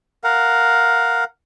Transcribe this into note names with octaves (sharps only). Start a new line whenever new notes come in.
A#4 F5 F#5